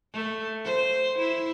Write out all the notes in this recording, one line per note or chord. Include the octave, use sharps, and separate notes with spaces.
A3
C5
E4